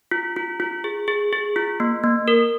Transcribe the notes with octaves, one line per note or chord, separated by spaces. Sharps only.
F4
F4
F4
G#4
G#4
G#4
F4
A#3
A#3
A#4